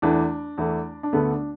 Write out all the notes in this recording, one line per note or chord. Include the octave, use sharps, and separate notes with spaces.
E2 E3 A3 D4
E2 E3 A3
D4
D2 D3 A3 B3
D4